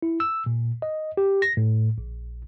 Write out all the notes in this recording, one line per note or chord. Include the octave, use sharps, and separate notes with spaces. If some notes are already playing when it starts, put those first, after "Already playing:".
E4
E6
A#2
D#5
G4
A#6
A2
A#1